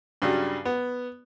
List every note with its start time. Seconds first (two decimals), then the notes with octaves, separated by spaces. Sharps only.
0.22 G2 C#3 F#3 G3
0.65 B3